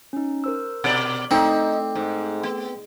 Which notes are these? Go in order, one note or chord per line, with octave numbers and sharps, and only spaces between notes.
C#4 D#4
A#4 C5 E6
B2 D5
A3 C4 D#4 A4 D6
G#2
B3